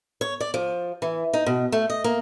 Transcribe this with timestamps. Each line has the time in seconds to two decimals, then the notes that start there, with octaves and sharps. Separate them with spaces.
0.21 C#5
0.40 D5
0.54 F3
1.02 E3
1.33 D#4
1.46 B2
1.72 A3
1.90 D#5
2.04 A#3